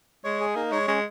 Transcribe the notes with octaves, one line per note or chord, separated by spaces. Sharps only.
G#3 C#5
G#4
A#3 D#4
G#3 C#5
G#3 C#4